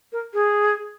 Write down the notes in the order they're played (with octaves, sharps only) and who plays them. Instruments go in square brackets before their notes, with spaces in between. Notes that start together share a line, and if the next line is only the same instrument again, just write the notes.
[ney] A#4
G#4